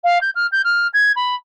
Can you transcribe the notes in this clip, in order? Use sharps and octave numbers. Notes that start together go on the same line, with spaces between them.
F5
G6
F6
G6
F6
G#6
B5